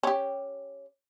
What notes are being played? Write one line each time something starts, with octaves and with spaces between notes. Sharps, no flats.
C#4 G4